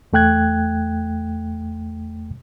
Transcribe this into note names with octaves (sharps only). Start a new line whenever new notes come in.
E2 A3 G5 F#6 G#6